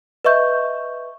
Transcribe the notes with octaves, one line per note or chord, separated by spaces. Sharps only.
B4 D#5 E5 C#6 G6